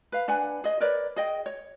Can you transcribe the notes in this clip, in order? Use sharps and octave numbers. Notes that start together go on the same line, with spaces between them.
B4 F5
D4 B4 F#5 G#5
G#4 D#5
A#4 B4 C#5 D5
G#4 D#5 G5
C#5